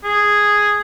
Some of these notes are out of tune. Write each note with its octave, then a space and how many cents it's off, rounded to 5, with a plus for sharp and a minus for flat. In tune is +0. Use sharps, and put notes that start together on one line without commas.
G#4 -5